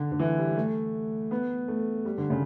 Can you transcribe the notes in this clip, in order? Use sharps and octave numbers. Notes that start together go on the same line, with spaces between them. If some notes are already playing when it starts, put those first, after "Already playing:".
Already playing: D3
D3
E3
G3
A3
B3
A3
G3
D3
C#3